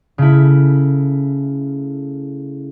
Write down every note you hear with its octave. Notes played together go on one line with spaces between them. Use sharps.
C#3 A3 E4